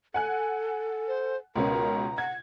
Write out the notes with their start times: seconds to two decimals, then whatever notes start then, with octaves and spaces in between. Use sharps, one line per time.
0.14 A4 F#5 G#5 F#6
1.08 C5
1.56 C#2 B2 C#4 A#4 A#5
2.18 F#5 G#6